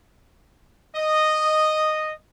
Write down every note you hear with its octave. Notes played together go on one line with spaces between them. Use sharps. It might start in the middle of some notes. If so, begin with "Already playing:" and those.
D#5